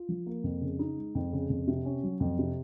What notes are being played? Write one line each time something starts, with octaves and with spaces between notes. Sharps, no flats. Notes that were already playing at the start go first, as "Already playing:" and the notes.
Already playing: F4
F3
A#3
F2
C#3
D#4
G#3
F2
C#3
F2
C3
C#4
F#3
F2
C3